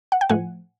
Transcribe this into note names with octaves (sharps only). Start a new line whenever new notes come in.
F#5
G5
A2 F3 A3 F#5 G#5